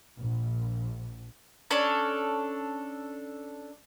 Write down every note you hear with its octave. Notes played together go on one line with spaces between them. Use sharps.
A#1
C#4 D4 A4 C#5